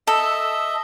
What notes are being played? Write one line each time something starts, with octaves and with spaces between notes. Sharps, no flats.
A4 D#5 E5